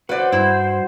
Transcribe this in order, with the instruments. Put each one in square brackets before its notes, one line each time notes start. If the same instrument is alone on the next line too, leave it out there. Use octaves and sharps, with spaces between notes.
[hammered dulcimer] F#4 [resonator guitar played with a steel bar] B4 D5 [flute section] C5 [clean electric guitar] F#5
[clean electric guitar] G2 [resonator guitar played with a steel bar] E4